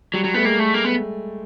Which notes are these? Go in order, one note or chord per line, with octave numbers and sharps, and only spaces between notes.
F#3 G3
F#3
A3 B3
G#3 A#3
A3
A#3
B3